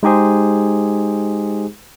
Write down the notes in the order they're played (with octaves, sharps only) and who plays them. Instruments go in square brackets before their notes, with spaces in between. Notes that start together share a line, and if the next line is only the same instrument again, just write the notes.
[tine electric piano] G#3 D#4 G4 G#4 C5